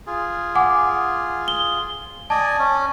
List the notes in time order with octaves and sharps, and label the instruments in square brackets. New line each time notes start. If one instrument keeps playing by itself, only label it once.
[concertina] F4 G#4
[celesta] F#5 G#5 D6
G7
[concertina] D5 D#5 G#5 [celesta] A5
[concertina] C#4